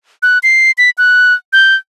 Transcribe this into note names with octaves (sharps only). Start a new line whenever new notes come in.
F#6
C7
B6
F#6
G6